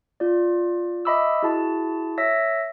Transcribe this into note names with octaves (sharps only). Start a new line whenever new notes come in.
F4 D5
D#5 E5 B5 D6 E6
E4 F#4 G#4 A5
C#5 E5 E6 A#6 B6